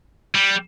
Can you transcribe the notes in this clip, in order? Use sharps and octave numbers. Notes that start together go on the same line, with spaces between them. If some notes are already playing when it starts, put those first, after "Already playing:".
G3